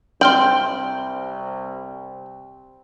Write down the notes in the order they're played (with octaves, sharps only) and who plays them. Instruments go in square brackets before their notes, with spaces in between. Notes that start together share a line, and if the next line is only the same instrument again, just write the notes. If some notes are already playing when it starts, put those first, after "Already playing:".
[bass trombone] C2 [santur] C4 [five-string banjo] G5 [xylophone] C6 F6 F#7